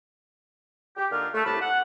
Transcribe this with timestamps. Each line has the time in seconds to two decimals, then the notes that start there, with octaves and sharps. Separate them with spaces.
0.97 G4
1.12 D3 A#3 D4 D#4 F4 F6
1.35 A3
1.46 C2 A2 D4 A5 B5
1.61 F#5